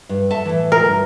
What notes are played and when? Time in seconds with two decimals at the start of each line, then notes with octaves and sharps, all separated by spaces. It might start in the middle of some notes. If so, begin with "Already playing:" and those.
0.09 G2
0.30 A4 E5 A5
0.45 A2 E3
0.72 A#4
0.85 D2 G2